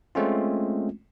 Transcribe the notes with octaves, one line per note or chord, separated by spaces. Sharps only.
G#3 A3 C4 C#4 F4